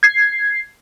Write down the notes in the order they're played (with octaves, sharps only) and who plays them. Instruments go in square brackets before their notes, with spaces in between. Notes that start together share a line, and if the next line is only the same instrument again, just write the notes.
[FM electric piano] G#6 C7